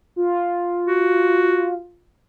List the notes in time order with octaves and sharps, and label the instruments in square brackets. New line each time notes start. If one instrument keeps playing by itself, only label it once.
[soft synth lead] F4
[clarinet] F#4